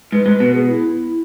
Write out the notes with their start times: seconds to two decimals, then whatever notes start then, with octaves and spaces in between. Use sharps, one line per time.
0.12 G#2 B4
0.26 G#2
0.40 B2
0.54 G#4
0.69 E4
0.96 E4